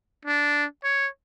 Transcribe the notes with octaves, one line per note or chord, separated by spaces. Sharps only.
D4
C#5